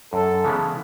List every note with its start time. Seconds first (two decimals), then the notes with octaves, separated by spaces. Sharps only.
0.13 F#2 A4
0.45 C#3 E3 G#3 B3